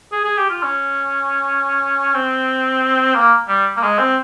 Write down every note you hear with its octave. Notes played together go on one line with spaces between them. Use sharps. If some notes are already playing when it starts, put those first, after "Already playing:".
G#4
G#4
G4
F4
C#4
C4
A#3
G3
A#3
G#3
C4